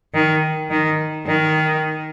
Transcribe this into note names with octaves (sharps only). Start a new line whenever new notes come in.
D#3
D#3
D#3